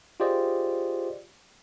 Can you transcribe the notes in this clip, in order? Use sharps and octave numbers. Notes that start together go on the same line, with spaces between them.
F4 G4 G#4 C5 D5 D#5